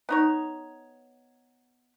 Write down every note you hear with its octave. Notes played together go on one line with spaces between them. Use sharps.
B3 D#4 C#5